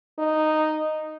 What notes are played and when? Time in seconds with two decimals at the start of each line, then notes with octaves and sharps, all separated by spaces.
0.19 D#4